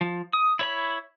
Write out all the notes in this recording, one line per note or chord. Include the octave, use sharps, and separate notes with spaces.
F3
D#6
E4 C#5 B5